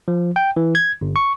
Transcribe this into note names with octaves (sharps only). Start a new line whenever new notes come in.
F3
G5
E3
G#6
G1
C#6